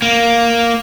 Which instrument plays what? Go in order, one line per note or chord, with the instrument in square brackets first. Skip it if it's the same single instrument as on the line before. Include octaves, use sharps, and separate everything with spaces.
[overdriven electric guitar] A#3